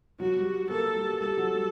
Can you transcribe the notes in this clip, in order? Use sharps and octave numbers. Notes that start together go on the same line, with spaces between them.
F#3 F#4
G3
A#3 A4
G3
G3 A4
F#3
G3